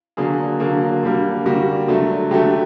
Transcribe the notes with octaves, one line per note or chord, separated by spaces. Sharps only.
D3 F#3 A#3 G#4
D3 F#3 A#3
D3 G3 A#3
D3 G3 A#3 F#4
D3 F#3 A3
D3 F#3 A3 G4